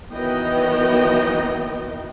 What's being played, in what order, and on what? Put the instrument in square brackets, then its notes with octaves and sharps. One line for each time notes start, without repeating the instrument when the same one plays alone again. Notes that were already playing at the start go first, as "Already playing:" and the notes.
[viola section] D#3 E3 F#3 B3 D#5 G5